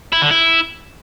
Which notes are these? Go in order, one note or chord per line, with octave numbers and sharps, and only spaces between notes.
E4
D3
E4